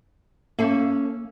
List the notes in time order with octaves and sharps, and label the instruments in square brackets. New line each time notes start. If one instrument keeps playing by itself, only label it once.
[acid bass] A#3 [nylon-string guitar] C#4 A4 E5